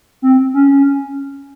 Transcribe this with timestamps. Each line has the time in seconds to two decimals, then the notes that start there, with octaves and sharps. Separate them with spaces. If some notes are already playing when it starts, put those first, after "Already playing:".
0.22 C4
0.54 C#4